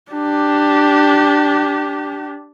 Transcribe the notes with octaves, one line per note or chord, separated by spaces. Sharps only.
D4 G4